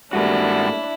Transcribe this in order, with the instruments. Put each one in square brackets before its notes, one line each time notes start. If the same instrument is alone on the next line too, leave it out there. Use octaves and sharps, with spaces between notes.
[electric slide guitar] G#2 F#4 [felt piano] G3 A3 A#3 [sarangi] D4 [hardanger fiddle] E4